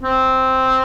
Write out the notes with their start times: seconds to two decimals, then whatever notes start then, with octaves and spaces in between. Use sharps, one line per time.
0.03 C4